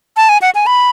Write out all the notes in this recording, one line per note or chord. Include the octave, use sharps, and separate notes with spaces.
A5
G#5
F#5
G#5
B5